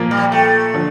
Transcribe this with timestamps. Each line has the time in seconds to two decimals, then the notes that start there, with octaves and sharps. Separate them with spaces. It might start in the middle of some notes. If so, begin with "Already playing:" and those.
Already playing: A#2 F3 A#3
0.11 G3
0.32 A3
0.74 D3 F3